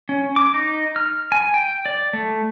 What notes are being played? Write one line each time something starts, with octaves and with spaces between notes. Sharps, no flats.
C#4
D6
D#4
F6
G#5
G5
D5
A3